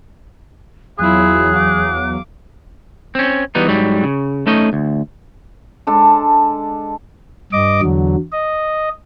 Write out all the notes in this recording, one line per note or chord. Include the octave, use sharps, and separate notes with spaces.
E2 F#3 E4 F4 G#4 F#6
F5 D6
C4 C#4
E3 G3 B3 D#4
G#2 F#3 G3
C#3
A3 C#4 D#4 D#5
D2
G#3 D4 A4
G2 D#5 D6
E2 D3 F#3
D#5